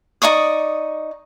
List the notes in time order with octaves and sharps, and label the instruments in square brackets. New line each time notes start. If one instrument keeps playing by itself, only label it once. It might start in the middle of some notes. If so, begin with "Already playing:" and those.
[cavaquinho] D#4 D5 C#6 D#6